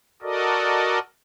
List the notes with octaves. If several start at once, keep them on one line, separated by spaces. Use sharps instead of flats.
F#4 A4 A#4 D5 D#5